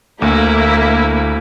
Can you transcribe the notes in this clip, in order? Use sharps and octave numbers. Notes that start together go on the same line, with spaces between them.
D2 A#3 E4